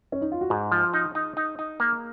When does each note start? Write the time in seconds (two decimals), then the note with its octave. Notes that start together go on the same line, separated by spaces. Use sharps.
0.12 C#4
0.21 D#4
0.32 F4
0.41 F#4
0.50 G#2 G#4
0.72 F3
0.94 D#4
1.15 D#4
1.37 D#4
1.59 D#4
1.80 A#3